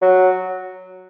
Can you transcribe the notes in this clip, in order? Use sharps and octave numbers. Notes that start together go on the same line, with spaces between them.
F#3